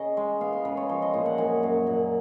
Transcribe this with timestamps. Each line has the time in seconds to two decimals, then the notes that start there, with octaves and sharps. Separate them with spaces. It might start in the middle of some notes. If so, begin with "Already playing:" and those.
Already playing: C#3 D#5
0.17 G#3
0.41 B3 F5
0.53 F5
0.65 C#3 B4
0.77 C#5
0.89 F3 F5
1.02 D#5
1.14 A#2 D#5
1.26 F#5
1.38 F#2 G#5
1.63 F#2
1.87 A#2 F#5